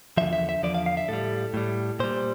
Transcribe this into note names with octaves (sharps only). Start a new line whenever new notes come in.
E2 D3 F3 E5
E5
E5
E2 D3 F3 D5
F5
F5
E5
A2 G3 A4
A2 G3
A#2 G3 C5